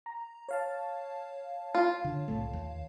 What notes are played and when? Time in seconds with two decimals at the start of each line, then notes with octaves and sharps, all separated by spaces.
0.06 A#5
0.49 C#5 F5 A5
1.75 F4
2.04 D3
2.28 C2 A2 A3
2.53 D#2